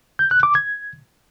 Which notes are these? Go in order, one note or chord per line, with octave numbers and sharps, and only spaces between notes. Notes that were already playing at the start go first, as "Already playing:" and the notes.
G6
F#6
D6
G#6